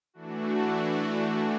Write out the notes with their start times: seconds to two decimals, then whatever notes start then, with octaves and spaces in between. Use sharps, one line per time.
0.14 E3 A3 D4 F#4